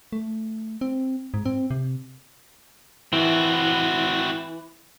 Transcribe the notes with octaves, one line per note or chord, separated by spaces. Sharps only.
A3
C4
G#2
C4
C3
E3 C4 F#4